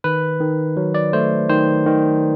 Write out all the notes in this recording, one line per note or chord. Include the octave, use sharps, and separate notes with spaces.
D#3 B4
D#3
F#3
D5
A3 C5
D#3 C5
D#3